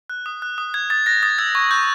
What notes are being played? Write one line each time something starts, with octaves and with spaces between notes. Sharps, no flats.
F#6
D#6
F#6
D#6
F#6 G#6
D#6 A6
F#6 A#6
D#6 A6
E6 G#6
C#6 G#6
C#6 G6